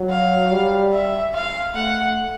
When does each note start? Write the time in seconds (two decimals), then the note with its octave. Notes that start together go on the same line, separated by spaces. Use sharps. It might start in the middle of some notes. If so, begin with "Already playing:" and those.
Already playing: F#3
0.10 F5
0.51 G3
0.93 E5
1.34 F5
1.75 A3 F#5